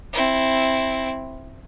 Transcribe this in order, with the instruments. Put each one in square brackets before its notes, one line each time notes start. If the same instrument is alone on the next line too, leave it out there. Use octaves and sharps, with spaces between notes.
[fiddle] C4 E4